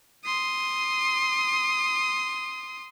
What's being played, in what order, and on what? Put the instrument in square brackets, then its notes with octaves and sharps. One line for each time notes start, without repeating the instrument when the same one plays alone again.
[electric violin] C6 D#6